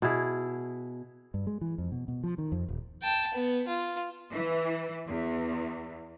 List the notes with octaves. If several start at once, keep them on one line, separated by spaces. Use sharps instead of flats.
B2 E4 G#4
G2
G#3
E3
F2
B2
B2
F3
D#3
F2
D#1
G5 A5
B3
F4
E3
E2